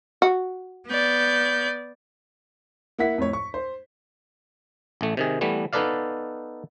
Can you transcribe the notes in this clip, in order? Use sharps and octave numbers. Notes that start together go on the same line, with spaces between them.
F#4
B3 D5 G6
A#3 E4 F#5 B6
F2 A2 C#5
C#6
C5
A1 A3
C3 D#3 G#4
E3 G3 A3 B3
B3 D#4 A4 B4 D5 F5